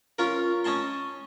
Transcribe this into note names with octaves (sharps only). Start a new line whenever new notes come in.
C#4 F4 A#4
C#4 D#5 G#5 A5 C6